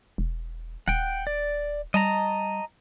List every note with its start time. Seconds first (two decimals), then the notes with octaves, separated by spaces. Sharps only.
0.18 E1
0.88 D#1 F#5 G5
1.27 D5
1.94 G3 D#5 A5 A#5